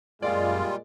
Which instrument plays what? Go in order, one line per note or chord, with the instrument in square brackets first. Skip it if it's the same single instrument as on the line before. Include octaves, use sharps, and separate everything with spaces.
[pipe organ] F#2 F5 [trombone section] A#2 G#3 [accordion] G3 F4 [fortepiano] D5